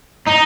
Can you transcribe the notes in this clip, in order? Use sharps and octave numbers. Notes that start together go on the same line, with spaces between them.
D#4